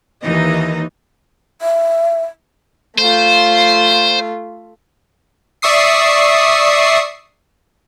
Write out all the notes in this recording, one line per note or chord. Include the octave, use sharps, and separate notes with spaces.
D#2 E3 D#4 D#5
E5
A3 F4 C5
D5 E5 C#6 D#6 C7